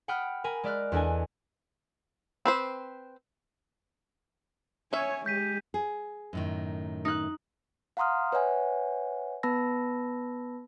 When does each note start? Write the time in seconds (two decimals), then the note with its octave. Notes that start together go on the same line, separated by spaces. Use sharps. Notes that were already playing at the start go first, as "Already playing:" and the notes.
0.08 F#5 G5 B5 D#6 F6
0.44 A#4 G#5 B5
0.64 G#3 D5 E5 F6 F#6
0.92 E2 B3 D4 A4 D#5 G#5
2.45 C4 B4 C5
4.93 C#4 C#5 E5 G#5
5.26 G#3 G4 G6 B6 D#7
5.74 G#4
6.33 F#2 A2 D#3
7.05 D#4 F#6
7.97 F5 F#5 A#5 C6 D#6 F6
8.32 B4 C#5 E5 F#5 G#5
9.43 B3 B4 A5 B5 E6 A#6